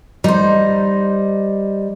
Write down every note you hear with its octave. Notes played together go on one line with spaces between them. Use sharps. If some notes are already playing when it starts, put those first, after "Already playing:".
G3 D#4 C5